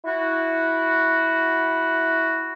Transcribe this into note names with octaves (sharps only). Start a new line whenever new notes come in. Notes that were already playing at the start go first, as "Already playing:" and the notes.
E4 F#4